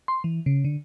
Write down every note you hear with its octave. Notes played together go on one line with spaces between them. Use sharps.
C6
E3
C#3
D3